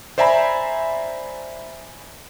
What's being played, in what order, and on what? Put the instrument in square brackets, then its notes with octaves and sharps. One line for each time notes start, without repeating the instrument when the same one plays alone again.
[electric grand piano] C5 D5 E5 G#5 A#5 B5